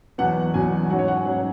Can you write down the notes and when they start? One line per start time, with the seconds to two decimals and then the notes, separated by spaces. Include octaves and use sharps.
0.18 E2 B2 F#3 B3 F#5
0.54 E2 B2 F#3 B3 G#5
0.90 G#2 F#3 C#4 F#5
0.99 C#5
1.08 F#5
1.17 G#5
1.25 G#2 F#3 C#4 F#5